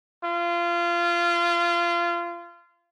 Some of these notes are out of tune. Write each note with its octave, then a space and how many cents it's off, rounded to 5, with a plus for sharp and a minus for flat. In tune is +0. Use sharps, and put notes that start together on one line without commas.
F4 -25